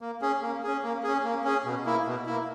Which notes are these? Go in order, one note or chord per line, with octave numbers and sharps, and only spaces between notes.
A#3
C#4 G#4
A#3
C#4 G#4
A#3
C#4 G#4
A#3
C#4 G#4
B2
A#3 E4
B2
A#3 E4